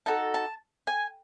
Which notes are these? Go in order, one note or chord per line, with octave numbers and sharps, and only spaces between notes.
D#4 F#4 A4 A5
A5
G#5